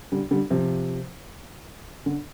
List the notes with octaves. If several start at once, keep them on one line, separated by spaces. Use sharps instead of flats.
D3 G3
D3 G3
C3 F3
D3